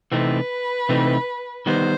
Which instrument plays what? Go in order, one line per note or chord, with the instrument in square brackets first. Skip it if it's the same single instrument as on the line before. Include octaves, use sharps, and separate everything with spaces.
[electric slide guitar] C3 E3 A3 C4 D#4 [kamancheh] B4
[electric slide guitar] C3 E3 A3 C4 D#4
[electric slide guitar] D#3 G3 B3 D#4 [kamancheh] C5